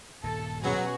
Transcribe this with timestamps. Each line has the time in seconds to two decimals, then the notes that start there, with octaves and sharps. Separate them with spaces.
0.24 D#1 G2 A4
0.64 B2 F#3 C#4 F#4 G#4 F#5